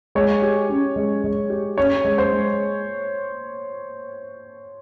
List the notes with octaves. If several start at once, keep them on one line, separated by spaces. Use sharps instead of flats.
G#3 C#5
G4
C#4
G#3
G#3
G4
C#4 C#5
G#3
C5
G#3